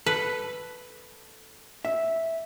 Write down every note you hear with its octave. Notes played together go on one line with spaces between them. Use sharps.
A4 B4
E5